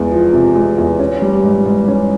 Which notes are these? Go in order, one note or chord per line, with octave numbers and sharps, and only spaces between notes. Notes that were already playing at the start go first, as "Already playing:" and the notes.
Already playing: E2 G#3
F3
C3
G#3
E2
C#4
G3
G#2
G#2
C#4